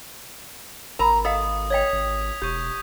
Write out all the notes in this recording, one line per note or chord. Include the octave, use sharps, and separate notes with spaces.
G#1 A#4 A#5 B5
A4 D#5 F5 D#6
C#5 D#5 G5 G#6 B6 F7
G#1
E1 G4 C#6 G6